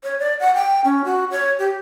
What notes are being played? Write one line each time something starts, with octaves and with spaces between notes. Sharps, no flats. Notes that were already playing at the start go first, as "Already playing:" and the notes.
C#5
D5
F#5
G5
C#4
F#4
C#5
G4